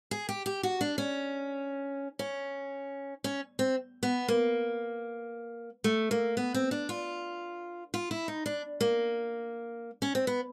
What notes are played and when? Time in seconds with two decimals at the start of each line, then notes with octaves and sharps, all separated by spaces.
0.11 G#4
0.29 G4
0.46 G4
0.63 F#4
0.81 D4
0.98 C#4
2.19 C#4
3.24 C#4
3.59 C4
4.03 B3
4.28 A#3
5.84 A3
6.11 A#3
6.37 B3
6.54 C4
6.71 D4
6.89 F4
7.94 F4
8.11 E4
8.28 D#4
8.46 D4
8.80 A#3
10.02 C#4
10.15 C4
10.27 B3